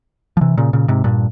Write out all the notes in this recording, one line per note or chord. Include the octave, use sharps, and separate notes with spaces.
F3
C3 E3
A#2 C#3
A#2 C#3
G#2 C3
G2 A#2